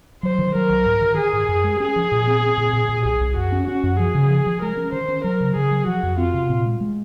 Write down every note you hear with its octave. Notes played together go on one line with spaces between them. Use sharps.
F#3 C5
D#3
F#3 A#4
C2
G#2
D#3
D#3 G#4
G#2
F#2
G#3
C#4 G#4
F3
A#2
C4
C4
A#2
A#2
A#2
C2 G#4
C2
F#2 F#4
C#4
C#4 F#4
F#2
F3 G#4
C#3
F3
F3
G#3 A#4
C#4
D#3 C5
C#4
F#3 A#4
C#3
C#3 G#4
F#3
F3 F#4
F2
C4 F4
C3
A#2
G#3
G#3